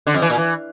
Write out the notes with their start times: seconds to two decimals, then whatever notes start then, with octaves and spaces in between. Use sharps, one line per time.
0.07 D3
0.14 F2
0.22 E3
0.30 A#2
0.37 E3